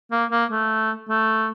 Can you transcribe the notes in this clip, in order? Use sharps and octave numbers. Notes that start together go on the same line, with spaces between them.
A#3
A#3
A3
A3